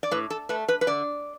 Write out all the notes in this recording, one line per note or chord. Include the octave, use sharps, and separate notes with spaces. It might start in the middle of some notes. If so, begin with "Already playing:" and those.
D5
A2 B4
A4
A3 B4
B4
B4
D3 D5